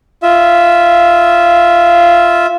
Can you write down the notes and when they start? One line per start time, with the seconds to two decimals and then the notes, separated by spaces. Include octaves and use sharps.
0.23 F4 E5